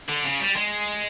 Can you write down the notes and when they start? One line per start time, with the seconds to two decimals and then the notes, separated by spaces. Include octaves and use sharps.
0.09 D3
0.24 C#3
0.40 G3
0.56 G#3